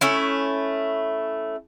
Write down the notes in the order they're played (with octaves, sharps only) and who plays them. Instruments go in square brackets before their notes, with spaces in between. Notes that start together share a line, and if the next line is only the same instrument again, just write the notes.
[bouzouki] A3 C#4 E4